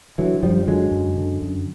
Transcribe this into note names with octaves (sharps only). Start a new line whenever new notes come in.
D3 E3 F#3
F#2 F3 G3
D3 F#3 G#3
F#2
D3
F#2